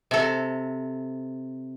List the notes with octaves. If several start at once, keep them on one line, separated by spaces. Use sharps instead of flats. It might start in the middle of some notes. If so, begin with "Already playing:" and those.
C3 A4